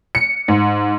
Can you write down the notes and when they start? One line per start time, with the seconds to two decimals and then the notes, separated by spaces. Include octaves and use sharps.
0.15 C#7
0.48 G#2